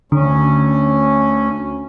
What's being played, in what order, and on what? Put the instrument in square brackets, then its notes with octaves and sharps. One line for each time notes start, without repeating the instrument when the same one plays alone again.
[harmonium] D2 C#4 [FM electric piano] D3